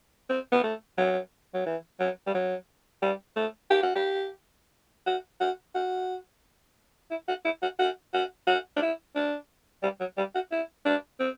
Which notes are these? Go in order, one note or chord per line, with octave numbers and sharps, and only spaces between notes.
C4
B3
A3
F#3
F#3
E3
F#3
G3
F#3
G3
A3
G4
F#4
G4
F#4
F#4
F#4
E4
F#4
E4
F#4
F#4
F#4
F#4
D4
E4
D4
G3
F#3
G3
F#4
E4
D4
C4